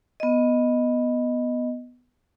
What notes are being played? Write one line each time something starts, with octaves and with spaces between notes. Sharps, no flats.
B3 D#5